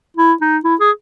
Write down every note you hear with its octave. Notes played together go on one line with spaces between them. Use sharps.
E4
D#4
E4
G#4